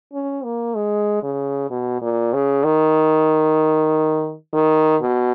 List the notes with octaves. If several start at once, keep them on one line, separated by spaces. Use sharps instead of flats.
C#4
A#3
G#3
C#3
B2
A#2
C#3
D#3
D#3
B2